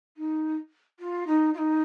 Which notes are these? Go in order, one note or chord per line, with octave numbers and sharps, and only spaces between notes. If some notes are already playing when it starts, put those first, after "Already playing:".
D#4
F4
D#4
F4
D#4